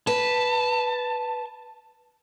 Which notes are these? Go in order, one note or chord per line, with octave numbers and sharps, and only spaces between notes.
B4 A5